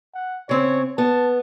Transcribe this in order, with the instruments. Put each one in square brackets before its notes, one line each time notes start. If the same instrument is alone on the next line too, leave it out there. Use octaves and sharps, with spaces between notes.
[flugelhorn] F#5
[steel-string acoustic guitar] C#3 C4 [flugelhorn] C#5
[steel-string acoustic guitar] B3 [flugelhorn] A5